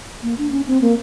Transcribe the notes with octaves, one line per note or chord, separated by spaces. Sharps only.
A#3
D4
C#4
C4
A#3